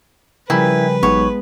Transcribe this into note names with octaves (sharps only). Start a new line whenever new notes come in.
C#3 F3 G3 E4 A#4 B4 G5 G#5
A1 F#3 G#3 B3 D#4 C#5